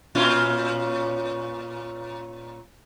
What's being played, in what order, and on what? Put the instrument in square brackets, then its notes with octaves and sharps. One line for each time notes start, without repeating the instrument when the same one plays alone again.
[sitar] A#2 C#4 F4